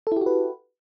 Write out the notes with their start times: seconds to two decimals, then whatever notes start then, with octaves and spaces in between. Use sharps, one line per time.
0.07 A4
0.12 E4
0.17 G4
0.21 F#4
0.26 B4